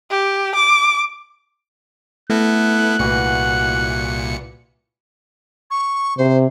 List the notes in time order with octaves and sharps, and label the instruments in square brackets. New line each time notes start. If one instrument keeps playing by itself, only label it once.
[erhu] G4
D6
[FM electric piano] A3 [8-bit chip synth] B3 E4 A4 [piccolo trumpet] F#6
[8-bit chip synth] C2 A#2 C#7 [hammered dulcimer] E3 F#4 G#5
[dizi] C#6
[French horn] C3 [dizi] C5